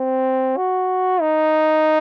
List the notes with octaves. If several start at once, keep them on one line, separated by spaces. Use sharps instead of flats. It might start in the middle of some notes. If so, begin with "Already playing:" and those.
Already playing: C4
F#4
D#4